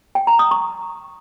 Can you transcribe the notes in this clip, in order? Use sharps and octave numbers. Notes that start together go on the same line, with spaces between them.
G5
A#5
D#6
C#6